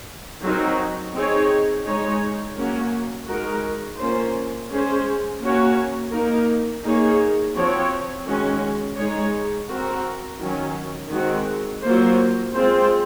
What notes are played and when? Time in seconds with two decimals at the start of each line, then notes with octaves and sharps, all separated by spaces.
0.43 F#3 C4 D#4 F#4 A#4
1.14 C4 D#4 G#4 C#5
1.86 G#3 D#4 G#4 C#5
2.57 F#3 A#3 C#4 F#4
3.28 G#3 D#4 F#4 A#4
4.00 A#3 C#4 F4 C5
4.71 G#3 C#4 G#4 C5
5.42 A#3 C#4 F#4 C#5
6.13 A#3 D#4 A#4
6.84 A#3 D#4 G#4 C#5
7.56 F3 C4 F#4 C#5
8.27 D#3 G#3 C#4 F#4
8.98 G#3 D#4 G#4 C#5
9.70 C4 F#4 A#4
10.41 D#3 F#3 C#4
11.12 D#3 G#3 C4 F#4
11.83 F#3 A#3 F4 C5
12.55 G#3 C4 F4 G#4 C5